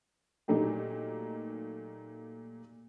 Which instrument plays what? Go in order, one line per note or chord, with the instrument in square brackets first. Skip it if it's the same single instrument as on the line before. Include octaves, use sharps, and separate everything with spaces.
[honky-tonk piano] A#2 F#3 A3 A#3 D#4 G4